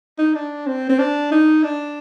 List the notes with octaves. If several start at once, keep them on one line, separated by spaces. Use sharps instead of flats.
D#4
D4
C4
C4
D4
D#4
D4